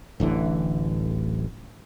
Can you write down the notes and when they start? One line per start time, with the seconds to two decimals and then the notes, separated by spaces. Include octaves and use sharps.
0.20 D1 A1 D3 E3